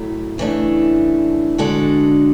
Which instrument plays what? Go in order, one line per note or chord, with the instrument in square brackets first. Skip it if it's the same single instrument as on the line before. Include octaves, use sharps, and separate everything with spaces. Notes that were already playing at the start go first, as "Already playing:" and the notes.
Already playing: [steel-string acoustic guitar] A2 F#3 A3 E4
C#3 E3 A3 D4
D3 G#3 D4 F#4 A4